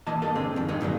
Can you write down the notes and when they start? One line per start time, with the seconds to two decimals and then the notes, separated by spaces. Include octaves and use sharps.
0.07 E3 A#3 D#5 A5
0.22 G2 A#3 A4 D#5
0.35 D3 G#3 C4
0.56 F2 D#3
0.69 G2 G#3 D#4
0.81 D2 G2 F#3 A#3